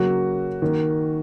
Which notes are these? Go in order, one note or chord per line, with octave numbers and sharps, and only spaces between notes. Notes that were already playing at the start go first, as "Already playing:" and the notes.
Already playing: C#3 F#3 A#3 F#4
D#3 A#3